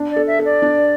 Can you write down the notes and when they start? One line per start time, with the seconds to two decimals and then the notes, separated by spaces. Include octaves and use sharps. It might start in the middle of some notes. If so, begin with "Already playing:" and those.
Already playing: D4
0.10 D5
0.16 A4
0.27 E5
0.39 A4
0.45 D5
0.62 D4